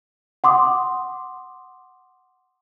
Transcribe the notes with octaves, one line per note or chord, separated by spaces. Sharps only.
F#5 C6 D6 D#6